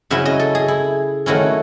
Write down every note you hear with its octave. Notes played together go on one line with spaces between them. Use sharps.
C#3 F#3 C#4 E4 E5
D#5
A4
G#4
E4
D#3 F#3 A3 C#4 E4